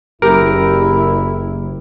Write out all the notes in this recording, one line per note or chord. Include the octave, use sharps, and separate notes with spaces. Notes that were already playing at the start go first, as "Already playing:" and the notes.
F#1 E4 G4 A#4